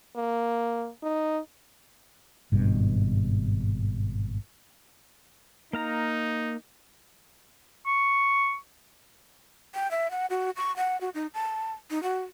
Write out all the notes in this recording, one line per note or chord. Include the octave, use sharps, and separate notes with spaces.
A#3
D#4
G#1 G2 B2
A#3 D#4 F5 A#5
C#6
G5
E5
F#5
F#4
C#6
F#5
F#4
D#4
A5
D#4
F#4